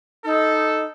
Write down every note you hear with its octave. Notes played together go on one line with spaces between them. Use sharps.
D#4 A4